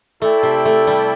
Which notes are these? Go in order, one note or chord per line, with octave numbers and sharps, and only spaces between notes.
A3 E4 A4 D5 G5
C3
A3
G3